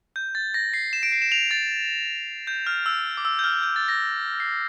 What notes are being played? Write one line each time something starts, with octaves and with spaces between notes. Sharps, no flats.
G6
A6
A#6
C7
E7
D7
C7
E7
F7
A6
G6
F6
E6
D6
E6
G6
F6
G6
A6
A#6
C7